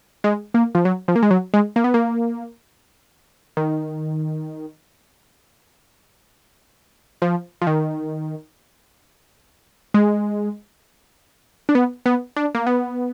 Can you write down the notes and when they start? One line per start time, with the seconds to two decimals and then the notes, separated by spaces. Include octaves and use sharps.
0.24 G#3
0.54 A#3
0.75 F3
0.85 F#3
1.08 F3
1.16 A#3
1.23 G#3
1.31 F#3
1.54 G#3
1.76 A#3
1.84 B3
1.94 A#3
3.57 D#3
7.22 F3
7.62 F3
7.67 D#3
9.94 G#3
11.69 D4
11.75 B3
12.06 B3
12.36 D4
12.55 A#3
12.67 B3